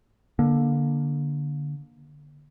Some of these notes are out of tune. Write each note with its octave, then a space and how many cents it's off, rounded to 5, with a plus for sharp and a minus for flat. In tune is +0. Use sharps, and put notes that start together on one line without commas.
D3 +0 A#3 +25